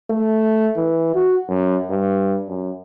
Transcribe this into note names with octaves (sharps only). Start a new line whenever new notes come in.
A3
E3
F#4
F#2
G2
F#2